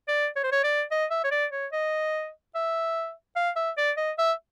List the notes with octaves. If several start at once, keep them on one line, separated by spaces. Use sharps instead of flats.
D5
C#5
C5
C#5
D5
D#5
E5
C#5
D5
C#5
D#5
E5
F5
E5
D5
D#5
E5